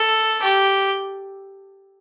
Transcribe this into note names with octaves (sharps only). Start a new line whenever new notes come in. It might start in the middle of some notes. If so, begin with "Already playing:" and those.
Already playing: A4
G4